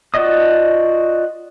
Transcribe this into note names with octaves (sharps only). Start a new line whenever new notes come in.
F4 F#4 D5 D#5 D#6